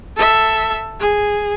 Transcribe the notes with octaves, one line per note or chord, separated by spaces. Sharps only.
A4 E5
G#4